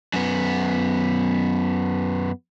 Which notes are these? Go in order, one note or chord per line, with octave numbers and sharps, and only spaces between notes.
F#2 B3